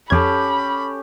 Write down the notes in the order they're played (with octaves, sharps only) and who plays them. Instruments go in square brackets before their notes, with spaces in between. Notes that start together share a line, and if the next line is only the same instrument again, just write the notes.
[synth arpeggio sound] F2 G#6 [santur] C#4 G4 A4 [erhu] B5